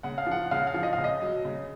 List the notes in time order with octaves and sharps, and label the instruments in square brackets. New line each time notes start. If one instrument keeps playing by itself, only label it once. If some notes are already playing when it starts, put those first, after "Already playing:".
[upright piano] C#3 F#5
F5
F3 F#5
C#3 F5
F5
F3
D#5
F5
C#3
D#5
F#3
C#3